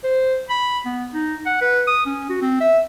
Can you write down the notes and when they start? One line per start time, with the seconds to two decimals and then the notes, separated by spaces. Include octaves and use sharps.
0.04 C5
0.50 B5
0.85 B3
1.14 D#4
1.46 F#5
1.61 B4
1.87 D#6
2.06 C#4
2.30 F#4
2.42 C4
2.60 E5